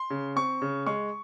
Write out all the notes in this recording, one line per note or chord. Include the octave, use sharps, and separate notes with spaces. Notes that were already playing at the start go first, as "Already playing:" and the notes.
Already playing: C6
C#3
C4 C#6
C#3
G#3 C#6